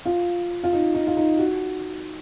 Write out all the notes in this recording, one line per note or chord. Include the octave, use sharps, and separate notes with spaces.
F4
F4
D#4
D#4
F4
D#4
F#4